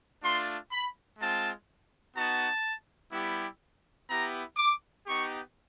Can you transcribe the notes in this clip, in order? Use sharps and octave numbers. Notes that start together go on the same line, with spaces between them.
A3 D4 F4 C6
B5
G#3 C4 F4 A5
B3 D#4 F#4 A5
G3 B3 E4 G4
B3 E4 G4 A#5
D6
B3 D#4 G4 C#6